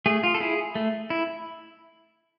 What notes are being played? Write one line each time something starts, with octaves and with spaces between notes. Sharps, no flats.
A3 G#4
F4
A4
E4 G#4
A3
E4